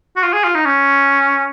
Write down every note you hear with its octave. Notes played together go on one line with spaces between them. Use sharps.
F#4
F4
G#4
F4
D#4
C#4